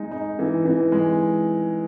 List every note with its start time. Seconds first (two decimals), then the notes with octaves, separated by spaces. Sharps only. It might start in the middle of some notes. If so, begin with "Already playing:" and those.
Already playing: G#3 D#4
0.11 D#4
0.39 E3
0.65 E3
0.92 G#3